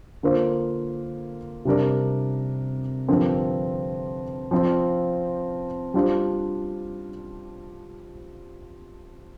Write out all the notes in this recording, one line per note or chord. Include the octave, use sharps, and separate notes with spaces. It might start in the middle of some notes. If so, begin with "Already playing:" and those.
D3 A#3 F4 C5
C3 G3 D4 A#4 D5
G2 D3 F3 C4 A#4
F3 C4 F4
G3 D4 F4 C5